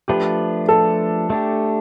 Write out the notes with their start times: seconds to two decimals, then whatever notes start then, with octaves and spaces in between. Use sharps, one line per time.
0.08 F3 A3 D4 F4 G4 B4
0.69 A4
1.30 A3 D4 G4